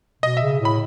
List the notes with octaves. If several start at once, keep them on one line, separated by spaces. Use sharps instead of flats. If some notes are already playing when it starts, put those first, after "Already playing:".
B2 D#5
C#3 E5
A2 B5